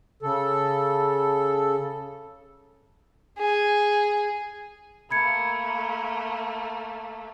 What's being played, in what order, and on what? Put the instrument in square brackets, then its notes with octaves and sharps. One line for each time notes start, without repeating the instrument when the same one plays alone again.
[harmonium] C#3 A4
[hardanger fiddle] G#4
[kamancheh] A3 A#3 [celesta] B5 G#6 C#7